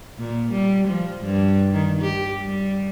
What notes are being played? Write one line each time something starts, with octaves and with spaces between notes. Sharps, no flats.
A#2
G3
F3
G2
D#3
G4
G3